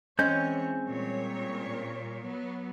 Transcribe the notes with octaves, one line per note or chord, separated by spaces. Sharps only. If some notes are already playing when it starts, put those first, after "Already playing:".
E3 G#3 C4 C#4 C#5 G#5 G6
A#2 G3 C#5
F#3 B3